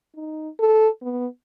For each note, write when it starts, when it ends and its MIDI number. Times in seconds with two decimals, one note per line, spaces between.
0.16 0.49 63
0.60 0.88 69
1.02 1.27 59